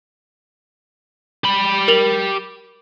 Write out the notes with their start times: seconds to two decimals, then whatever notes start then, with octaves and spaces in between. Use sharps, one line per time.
1.44 G4 B5
1.88 A#4 F7 F#7